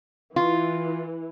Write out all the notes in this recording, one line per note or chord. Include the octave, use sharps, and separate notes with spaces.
E3 F4